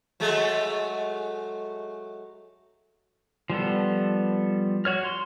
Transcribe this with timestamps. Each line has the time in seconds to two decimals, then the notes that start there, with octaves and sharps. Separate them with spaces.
0.20 F#3 G#3 A3
3.50 F3 G3 B3 A4
4.85 F#4 C#5 F6
5.05 C6